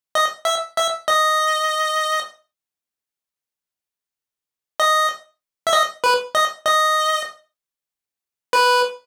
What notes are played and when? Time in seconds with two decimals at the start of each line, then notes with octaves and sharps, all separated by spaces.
0.15 D#5
0.45 E5
0.77 E5
1.08 D#5
4.80 D#5
5.67 E5
5.73 D#5
6.04 B4
6.35 D#5
6.66 D#5
8.53 B4